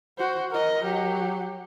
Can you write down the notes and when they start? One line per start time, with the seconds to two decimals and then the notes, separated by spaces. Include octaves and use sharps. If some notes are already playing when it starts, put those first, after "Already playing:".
0.18 F#4 C5
0.51 A#4 D#5
0.84 F#3 G4